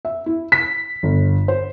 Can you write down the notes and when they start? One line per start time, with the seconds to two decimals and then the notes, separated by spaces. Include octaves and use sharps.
0.05 E5
0.26 E4
0.52 B6
1.03 G1
1.48 C5